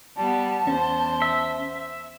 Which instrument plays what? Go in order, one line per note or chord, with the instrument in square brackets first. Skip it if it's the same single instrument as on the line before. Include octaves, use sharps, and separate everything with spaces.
[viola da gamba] G3 B3 [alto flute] A5
[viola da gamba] E2 C5 [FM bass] C#4
[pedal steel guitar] E5